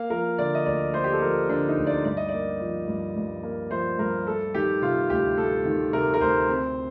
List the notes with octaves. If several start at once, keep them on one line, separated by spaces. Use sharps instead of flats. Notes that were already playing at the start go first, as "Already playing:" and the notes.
Already playing: A#3 F5
F3 A#4
D3 D5
D#5
D2 D5
A#3 C5
G4
A4
F3 A#4
D3 D4
D#4
D2
D5
G2 D5
D#5
A#3 D5
F3
G2
G2
A#3
F3 C5
G2 A#4
A3 A4
D#3 G4
C3 F4
D2 G4
A3 A4
D#3
C3 A#4
A#4
D2 C5
C4